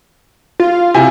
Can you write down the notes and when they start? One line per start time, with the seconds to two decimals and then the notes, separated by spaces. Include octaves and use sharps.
0.60 F4
0.94 C3 E4 G#5